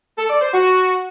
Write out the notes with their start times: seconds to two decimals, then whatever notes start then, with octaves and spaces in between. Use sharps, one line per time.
0.18 A4
0.30 D5
0.41 C5
0.53 F#4